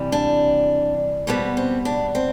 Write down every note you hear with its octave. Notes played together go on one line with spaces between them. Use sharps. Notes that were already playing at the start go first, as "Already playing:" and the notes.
Already playing: C3 E3 G3
D4
B2 G3 B3 C4
C4
D4
C4